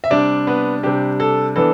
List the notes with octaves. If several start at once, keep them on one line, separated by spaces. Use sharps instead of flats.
E5
C3 G3 D4 D5
B3 B4
C3 G3 D4 G4
A4
E3 B3 D4 A4